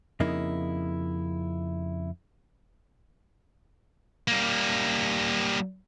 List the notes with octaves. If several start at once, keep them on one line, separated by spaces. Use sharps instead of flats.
F2 C#3 A#3 D#4 E4
G3 A#3